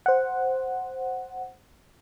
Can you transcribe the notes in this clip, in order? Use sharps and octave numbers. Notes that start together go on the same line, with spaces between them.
C5 F#5